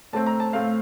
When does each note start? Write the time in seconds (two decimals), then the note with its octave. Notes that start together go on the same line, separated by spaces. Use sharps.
0.13 A2 A3 C4 A5
0.26 A#5
0.40 A5
0.53 A2 A3 C4 F5